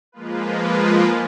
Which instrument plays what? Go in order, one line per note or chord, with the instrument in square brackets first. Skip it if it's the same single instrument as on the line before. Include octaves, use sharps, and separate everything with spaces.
[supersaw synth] F3 G#3 A#3 F4 B4